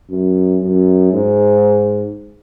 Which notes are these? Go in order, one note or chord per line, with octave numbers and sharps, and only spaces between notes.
F#2
F#2
G#2